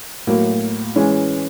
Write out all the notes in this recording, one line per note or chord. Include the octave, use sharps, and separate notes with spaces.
A2 F#3 A#3
E3 G#3 C#4